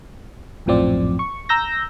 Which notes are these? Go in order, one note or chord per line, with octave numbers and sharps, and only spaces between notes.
A#1 F#2 A2 F3 C4 D5
C#6
A#5 E6 G6 A#6